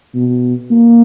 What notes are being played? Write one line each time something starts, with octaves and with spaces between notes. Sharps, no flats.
B2
A#3